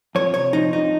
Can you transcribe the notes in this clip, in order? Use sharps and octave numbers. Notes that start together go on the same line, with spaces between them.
F2 C#5
C3 C#5
F3 D#4
F2 D#4